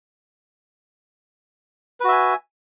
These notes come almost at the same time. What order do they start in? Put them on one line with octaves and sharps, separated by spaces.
B4 F#4 E5 G#5